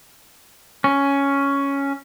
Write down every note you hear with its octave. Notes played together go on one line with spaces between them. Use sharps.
C#4